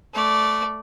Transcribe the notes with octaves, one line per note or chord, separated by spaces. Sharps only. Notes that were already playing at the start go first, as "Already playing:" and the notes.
A3 D5